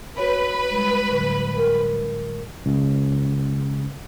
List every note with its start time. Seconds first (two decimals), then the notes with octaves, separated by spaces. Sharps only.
0.17 F#4 B4 C#5 B5
0.70 G3 G#3
1.10 A2 D3 F#3
1.57 A#4
2.66 C#2